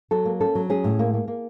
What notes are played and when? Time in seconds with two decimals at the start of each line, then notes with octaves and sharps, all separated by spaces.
0.11 F#3 A4
0.25 A#3
0.40 C#4 A4
0.55 F#3
0.70 C#4 G#4
0.84 A2
0.99 A#3
1.14 A#3
1.28 A#3